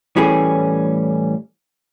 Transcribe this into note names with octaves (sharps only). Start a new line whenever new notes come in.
A2 E3 G3 A3 C#4 G#4